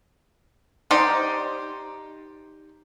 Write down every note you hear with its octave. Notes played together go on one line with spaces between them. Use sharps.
D#4 G4 C5 D5